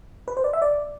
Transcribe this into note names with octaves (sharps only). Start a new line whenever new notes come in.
B4
C5
D5
E5
D5